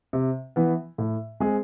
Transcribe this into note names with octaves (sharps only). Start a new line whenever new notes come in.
C3
E3 B3
A2
G#3 C4 G#4